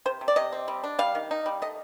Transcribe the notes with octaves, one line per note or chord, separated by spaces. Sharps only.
C3 C5
C3
D5
C3 D#5
C4
G3
D4
G3 F5
D#3
D#4
G3
A3 D#5